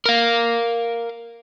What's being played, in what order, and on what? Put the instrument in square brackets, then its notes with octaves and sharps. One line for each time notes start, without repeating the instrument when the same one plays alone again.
[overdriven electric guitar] A#4 F5